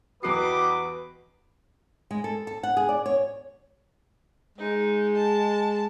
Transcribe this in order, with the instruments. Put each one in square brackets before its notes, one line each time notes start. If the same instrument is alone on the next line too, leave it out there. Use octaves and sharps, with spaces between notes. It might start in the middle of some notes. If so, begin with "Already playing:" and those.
[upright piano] E2 B3 C7 [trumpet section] G3 D#5 D6 [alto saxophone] F#4 [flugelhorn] B4
[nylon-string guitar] G#3
A4
A4
F#5
G#4
D5
C#5
[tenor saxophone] G#3 [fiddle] D#4
[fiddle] A5